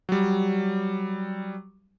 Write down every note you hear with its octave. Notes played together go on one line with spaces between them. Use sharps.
F#3 G3